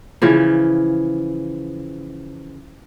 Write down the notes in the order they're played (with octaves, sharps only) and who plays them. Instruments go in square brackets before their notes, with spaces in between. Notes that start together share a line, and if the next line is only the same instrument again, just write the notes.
[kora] C#3 E3 F3